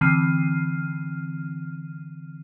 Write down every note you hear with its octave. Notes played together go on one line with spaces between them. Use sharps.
D3 E3 C4 F6 C7 D#7